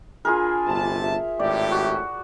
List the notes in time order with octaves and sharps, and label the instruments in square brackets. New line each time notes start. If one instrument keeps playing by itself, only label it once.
[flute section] D4 G#5 B5 [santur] F4 G#4 A#4
[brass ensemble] G1 C3 A5
[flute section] E5
[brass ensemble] G#1 A2 G4 [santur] D5
[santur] F#4